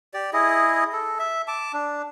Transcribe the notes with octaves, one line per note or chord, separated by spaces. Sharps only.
G4 D5
E4 G#4 D#5
A4
E5
A5 D6
D4